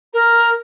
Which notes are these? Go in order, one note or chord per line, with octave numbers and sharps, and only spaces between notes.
A#4